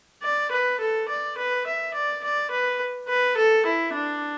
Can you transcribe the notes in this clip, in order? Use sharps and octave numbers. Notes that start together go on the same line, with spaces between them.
D5
B4
A4
D5
B4
E5
D5
D5
B4
B4
A4
E4
D4